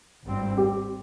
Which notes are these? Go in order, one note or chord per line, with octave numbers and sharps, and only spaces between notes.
G#1 G2 G3 C4
G4